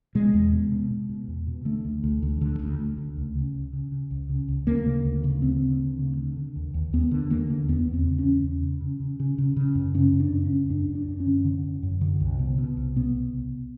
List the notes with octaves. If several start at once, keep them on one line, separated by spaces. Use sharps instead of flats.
B2 G#3
E2
B2
B2
B2
B2
E2
B2
D3 A3
D2
D2
D2
D3
D2
D2
D2
C#2
C#3
C#2
C#3
C#3
C#2
C#3
C#2
D2 A#3
C#3
D2
C#3
D2 C4
C#3
D2
C#3
D3
D3
D#2
D#2
D#2 B3
D3
D#2 A#3
D3
E2 B3
E2
C4
C#3
C#4
E2
E2
C#3
C#3
C#3
C#3
C#3
C#3
F#2
C#3 C#4
F#2
D4
C#3
C#4
F#2
F#2 D4
F#2
D4
F#2
C#4
D3
D3
F#2
F#2
D3
C2
B2
B2
C2
B2 B3
C2
C2